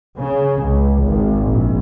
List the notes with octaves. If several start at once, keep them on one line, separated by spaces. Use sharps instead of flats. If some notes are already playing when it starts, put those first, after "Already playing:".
C#3
C#2
G#1
A#1